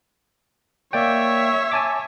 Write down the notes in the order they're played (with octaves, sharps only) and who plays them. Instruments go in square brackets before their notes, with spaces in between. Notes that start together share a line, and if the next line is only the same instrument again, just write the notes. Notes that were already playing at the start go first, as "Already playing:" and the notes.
[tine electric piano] A#3 D5 G5 [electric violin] C#5 E5
[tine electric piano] G#5 A5 D6